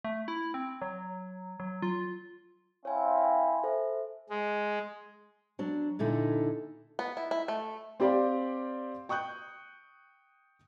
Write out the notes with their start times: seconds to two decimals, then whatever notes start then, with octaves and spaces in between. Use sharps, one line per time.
0.05 A3
0.28 E4
0.54 C4
0.82 F#3
1.60 F#3
1.82 F4
2.85 C4 E4 C#5 F5 G#5
3.18 G#5
3.63 A4 C5 E5
4.30 G#3
5.59 F#3 D4
5.99 A#2 D3 D#4 E4 A4
6.99 B3
7.17 E4
7.31 E4
7.48 A3
8.00 C4 G4 D5 F5 C6
9.09 G5 C#6 D#6 F#6 G6